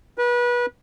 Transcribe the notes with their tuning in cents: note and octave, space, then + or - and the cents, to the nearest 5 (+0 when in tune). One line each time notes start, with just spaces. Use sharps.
B4 -30